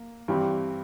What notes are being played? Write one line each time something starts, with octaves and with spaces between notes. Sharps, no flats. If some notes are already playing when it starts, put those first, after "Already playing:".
Already playing: A#3
G2 E3 G3 C4 G4